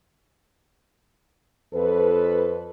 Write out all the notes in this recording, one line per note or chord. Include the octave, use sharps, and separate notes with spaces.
F2 A4 B4